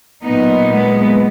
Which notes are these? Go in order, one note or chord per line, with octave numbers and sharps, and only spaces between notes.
A#2 F#3 B3 D#4
G#3 B3